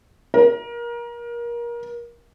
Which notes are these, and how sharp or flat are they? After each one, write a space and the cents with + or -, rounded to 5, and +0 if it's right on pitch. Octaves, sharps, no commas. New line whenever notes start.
A#4 +25